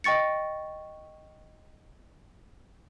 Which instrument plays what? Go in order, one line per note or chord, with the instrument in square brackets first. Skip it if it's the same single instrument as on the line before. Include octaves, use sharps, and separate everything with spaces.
[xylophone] D#5 G5 C#6 A6 C#7